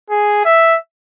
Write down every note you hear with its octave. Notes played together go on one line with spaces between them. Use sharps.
G#4
E5